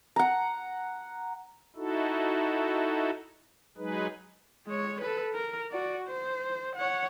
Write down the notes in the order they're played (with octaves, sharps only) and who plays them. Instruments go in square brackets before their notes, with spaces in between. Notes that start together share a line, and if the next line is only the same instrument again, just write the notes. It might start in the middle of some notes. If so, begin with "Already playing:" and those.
[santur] F#5 A#5
[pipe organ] D#4 E4 F#4 A4
F#3 G#3 D#4 G#4 B4
[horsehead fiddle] G#3 C#5
A4 B4
A#4
F#4 D5
C5
C#5 F#5